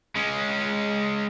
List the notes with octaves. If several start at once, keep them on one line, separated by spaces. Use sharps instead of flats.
G#3 C#4